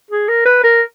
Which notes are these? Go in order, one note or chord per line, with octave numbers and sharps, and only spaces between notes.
G#4
A#4
B4
A#4